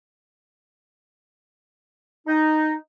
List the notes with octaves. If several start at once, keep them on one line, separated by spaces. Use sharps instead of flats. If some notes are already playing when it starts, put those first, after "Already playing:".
D#4